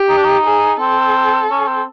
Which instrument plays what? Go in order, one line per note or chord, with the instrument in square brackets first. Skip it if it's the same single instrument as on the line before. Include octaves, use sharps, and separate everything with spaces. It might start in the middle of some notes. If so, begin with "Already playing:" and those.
Already playing: [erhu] G4
[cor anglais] D#4
D4
D#4
[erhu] G#4
[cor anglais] C4 [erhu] A4
[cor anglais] C#4
C4